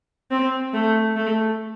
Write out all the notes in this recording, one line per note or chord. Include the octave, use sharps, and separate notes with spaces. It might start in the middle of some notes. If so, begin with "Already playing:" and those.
C4
A3
A3